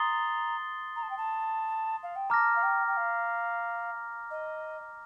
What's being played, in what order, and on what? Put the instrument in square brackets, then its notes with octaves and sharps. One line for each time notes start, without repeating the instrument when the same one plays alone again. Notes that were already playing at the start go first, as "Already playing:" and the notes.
Already playing: [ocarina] A#5 [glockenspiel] C6 D#6 A6 C7 G7
[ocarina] A#5
A5
G5
A5
F5
G5
[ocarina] A5 [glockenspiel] A#5 D6 F6 A#6
[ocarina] F5
G5
G5
F5
D#5